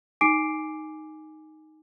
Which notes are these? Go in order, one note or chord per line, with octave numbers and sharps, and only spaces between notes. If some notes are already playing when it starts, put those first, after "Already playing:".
D#4 G#5 D6 C7 D7